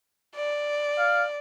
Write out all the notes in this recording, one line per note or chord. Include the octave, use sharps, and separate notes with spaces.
D5
F5